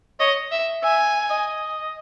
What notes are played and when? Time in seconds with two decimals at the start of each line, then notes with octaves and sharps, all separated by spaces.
0.20 C#5 D#5
0.52 E5
0.83 E5 G#5
1.30 D#5